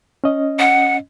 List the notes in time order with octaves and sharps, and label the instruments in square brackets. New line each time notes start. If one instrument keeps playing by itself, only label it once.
[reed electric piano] C#4 D#5
[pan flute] F#5